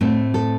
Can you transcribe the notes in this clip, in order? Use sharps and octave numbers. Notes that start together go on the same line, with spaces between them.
A2 A3 C4
A4